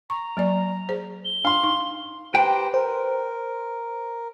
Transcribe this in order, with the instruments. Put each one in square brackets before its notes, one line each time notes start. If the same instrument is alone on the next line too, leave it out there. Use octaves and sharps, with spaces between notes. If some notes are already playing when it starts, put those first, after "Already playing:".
[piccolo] A#5 [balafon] C#6
[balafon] F#3 A#3 D5
G#4 C5
[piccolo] G7
[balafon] D4 [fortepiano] F5 C6
[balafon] D#4
[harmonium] G4 C5 A#5 [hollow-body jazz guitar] B4 G5
[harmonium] A#4 [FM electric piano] C5